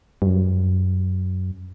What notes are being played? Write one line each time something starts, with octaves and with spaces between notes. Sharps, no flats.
G2
F#2